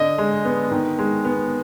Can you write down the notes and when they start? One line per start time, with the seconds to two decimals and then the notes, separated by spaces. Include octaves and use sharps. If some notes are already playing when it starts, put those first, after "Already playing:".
Already playing: D3 D#5
0.18 G#3
0.45 B3
0.71 D#3
0.99 G#3
1.24 B3